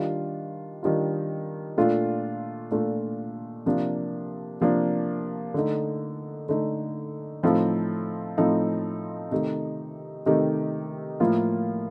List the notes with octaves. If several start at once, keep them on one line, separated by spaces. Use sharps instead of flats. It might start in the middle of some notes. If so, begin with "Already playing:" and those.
Already playing: D#3 G3 D4 F4
D#3 G3 D4 F4
A#2 A3 D4 F4
A#2 A3 D4 F4
C3 F3 A#3 D4
C3 F3 A#3 D4
D3 A3 D#4
D3 A3 D#4
A2 F3 C4 D#4 A4
A2 F3 C4 D#4 A4
C3 D#3 A3 D#4 G4
C3 D#3 A3 D#4 G4
A2 F3 A#3 F4